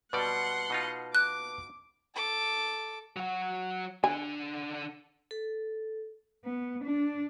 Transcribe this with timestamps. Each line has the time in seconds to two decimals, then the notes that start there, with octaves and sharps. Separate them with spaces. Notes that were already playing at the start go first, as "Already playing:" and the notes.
0.13 B2 G3 B4 D5 F#5 A5 C6
0.70 B2 D#4 F4
1.15 D6 F#6
2.14 A4 D6
3.16 F#3 F#4
4.04 D3 D4 G#5
5.31 A4
6.45 B3
6.84 D4